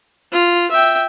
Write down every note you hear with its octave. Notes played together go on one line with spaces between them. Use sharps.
F4
E5 G5